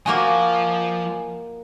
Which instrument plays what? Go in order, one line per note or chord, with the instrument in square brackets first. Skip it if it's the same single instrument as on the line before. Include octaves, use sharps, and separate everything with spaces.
[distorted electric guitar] F3 [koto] A#3 F#4 D#5 [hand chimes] G#5 D6